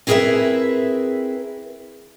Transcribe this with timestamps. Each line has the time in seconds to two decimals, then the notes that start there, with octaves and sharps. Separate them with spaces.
0.07 C4 E4 G#4 A#4 B4 E5